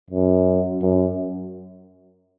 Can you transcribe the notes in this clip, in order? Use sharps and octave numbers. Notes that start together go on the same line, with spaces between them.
F#2
F#2